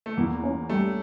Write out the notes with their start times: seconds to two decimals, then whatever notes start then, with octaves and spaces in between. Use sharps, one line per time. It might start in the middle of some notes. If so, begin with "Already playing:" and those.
0.06 A3
0.17 E2 A#3
0.43 C#4
0.70 G3 A3